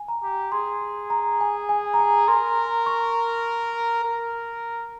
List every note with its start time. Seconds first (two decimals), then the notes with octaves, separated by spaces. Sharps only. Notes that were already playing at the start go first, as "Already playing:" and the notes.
Already playing: G#5
0.08 A#5
0.23 G4
0.52 G#4 C6
1.10 A#5
1.41 G#5
1.69 G#5
1.94 A#5
1.99 G#5
2.28 A#4 C6
2.86 C#6
4.04 A#4